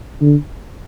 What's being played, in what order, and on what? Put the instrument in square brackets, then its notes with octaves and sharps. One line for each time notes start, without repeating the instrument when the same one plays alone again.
[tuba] D3